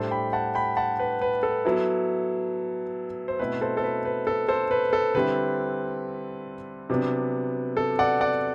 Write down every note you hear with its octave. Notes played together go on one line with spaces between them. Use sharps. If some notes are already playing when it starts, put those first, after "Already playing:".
Already playing: A2 G3 D4 A4 C5
G5 B5
F#5 A5
G5 B5
F#5 A5
B4
B4
A4
F#3 B3 E4
C5
B2 A3 C4 E4 B4
A4 C5
A4
B4
B4
A4
A4 C5
B4
A4
D3 G3 C4 E4 B4
C3 F#3 B3 D4
A4
D5 F#5
D5 F#5